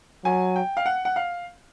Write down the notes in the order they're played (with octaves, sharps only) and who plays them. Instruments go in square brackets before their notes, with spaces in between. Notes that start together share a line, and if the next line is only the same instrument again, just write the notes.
[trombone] F#3 [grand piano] G#5
[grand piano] G5
F5
F#5
F#5
F5